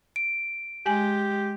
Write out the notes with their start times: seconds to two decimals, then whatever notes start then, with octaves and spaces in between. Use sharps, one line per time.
0.16 D7
0.86 G#3 G4 G#5